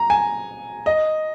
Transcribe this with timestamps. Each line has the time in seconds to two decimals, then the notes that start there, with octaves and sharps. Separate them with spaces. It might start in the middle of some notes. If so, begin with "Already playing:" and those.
Already playing: A#5
0.10 G#5
0.86 D#5